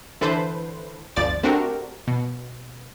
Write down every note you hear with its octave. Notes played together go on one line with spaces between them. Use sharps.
D3 E3 A4 B4 C5
G1 D2 F3 D5 A6
A3 C4 D4 F#4 G4 A#4
B2